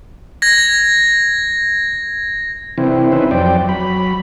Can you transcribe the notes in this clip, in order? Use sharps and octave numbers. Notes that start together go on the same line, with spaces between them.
G#6 A#6
C3 E3 C4 E4
C#4 D#4 B4 C5 E5
F2 F#3 C5 D5 G5
F#3 B5